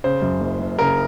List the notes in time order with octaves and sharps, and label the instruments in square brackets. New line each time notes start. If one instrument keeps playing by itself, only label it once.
[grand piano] C#3 C5
F#2
F#1
F#1
C#3 A#4